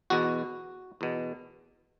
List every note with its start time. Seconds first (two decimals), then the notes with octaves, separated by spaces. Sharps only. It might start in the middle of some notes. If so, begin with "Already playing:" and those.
0.10 E2 B2 F#4
1.01 E2 B2